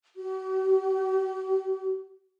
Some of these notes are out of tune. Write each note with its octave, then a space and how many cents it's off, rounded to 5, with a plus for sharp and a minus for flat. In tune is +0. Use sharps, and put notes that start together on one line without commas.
F#4 +45